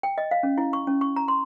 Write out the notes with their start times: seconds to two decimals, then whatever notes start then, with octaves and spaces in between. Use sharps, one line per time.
0.03 G5
0.18 D#5
0.31 F5
0.43 C#4
0.58 E4
0.73 C#6
0.87 C#4
1.01 C#6
1.16 A#5
1.28 C6